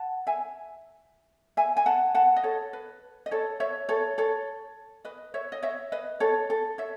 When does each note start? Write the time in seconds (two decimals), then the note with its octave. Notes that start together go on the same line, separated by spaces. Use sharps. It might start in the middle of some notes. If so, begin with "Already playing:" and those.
Already playing: F#5 A5
0.27 E5 G#5
1.57 E5 G#5
1.77 G#5
1.86 F#5 A5
2.15 F#5 A5
2.36 D#5
2.43 A4 C#5
2.73 B4
3.26 D#5
3.31 A4 C#5
3.60 C#5 E5
3.89 A4 C#5
4.18 A4 C#5
5.05 B4 D#5
5.34 C#5 E5
5.52 D#5
5.63 C#5 E5
5.92 B4 D#5
6.20 A4 C#5
6.50 A4
6.78 C#5 E5